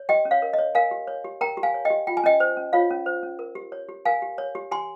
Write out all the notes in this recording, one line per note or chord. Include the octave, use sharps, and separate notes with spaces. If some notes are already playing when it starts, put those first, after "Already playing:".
Already playing: C#5
G4 D#5 G5
C#4
C#5 F5
A#4
C#5 D#5
A#4 F5 G#5
G4
C#5
G4
A#4 G5 A#5
G4
F5 G#5
C#5
D#5 G5
G4
F4 G5
G#5
C#4 D#5 G5
C5
C#4
F4 C#5 F5
C#4
C5
C#4
A#4
G4
C#5
G4
A#4 F5 G#5
G4
C#5
G4
G4 G#5 C6